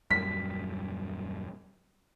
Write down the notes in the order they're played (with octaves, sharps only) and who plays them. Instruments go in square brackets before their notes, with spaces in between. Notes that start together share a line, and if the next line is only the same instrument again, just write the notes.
[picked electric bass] D#1 F#2 G3 [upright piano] B6